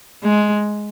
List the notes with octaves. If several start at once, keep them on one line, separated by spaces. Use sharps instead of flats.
G#3